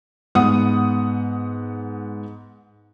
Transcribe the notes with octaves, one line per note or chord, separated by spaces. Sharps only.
G#2 B3 F#5 D#6